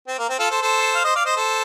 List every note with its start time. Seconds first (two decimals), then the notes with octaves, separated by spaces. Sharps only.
0.08 C4
0.19 A#3
0.29 C4
0.39 F4 A4
0.50 A4 C5
0.62 A4 C5
0.95 F5
1.04 C5 D#5
1.15 D5 F5
1.25 C5 D#5
1.36 A4 C5